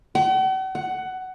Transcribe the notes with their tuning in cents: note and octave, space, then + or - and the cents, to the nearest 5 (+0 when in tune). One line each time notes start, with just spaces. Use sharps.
F#5 +45
F#5 +15